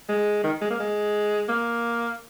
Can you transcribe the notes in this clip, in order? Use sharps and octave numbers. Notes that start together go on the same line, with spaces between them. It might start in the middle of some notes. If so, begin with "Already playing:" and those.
G#3
D#3
G#3
A#3
G#3
A#3